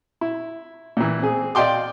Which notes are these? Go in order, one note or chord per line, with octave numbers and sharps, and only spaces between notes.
E4
A#2 E3
C4 G#4
D5 D#5 F5 G5 C6 D6